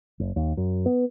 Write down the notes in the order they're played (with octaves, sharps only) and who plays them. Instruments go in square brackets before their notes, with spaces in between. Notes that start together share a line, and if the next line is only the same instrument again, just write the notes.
[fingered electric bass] F#1
D#2
F#2
B3